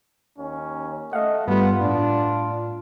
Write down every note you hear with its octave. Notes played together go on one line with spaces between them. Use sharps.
D#2 C#4
A3 D#5 F5 F#5
G2 G3 B3 F4
A2 D4